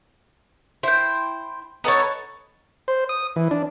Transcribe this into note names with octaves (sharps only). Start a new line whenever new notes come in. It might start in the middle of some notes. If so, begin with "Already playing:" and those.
E4 C5 G5
B3 D#4 A4 C#5 A5
C5
D#6
E3
D4